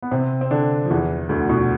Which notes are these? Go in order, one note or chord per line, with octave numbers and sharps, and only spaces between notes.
B3
C3 C4
C4
D3 D4
F3
E2 E3
D2 D3
B2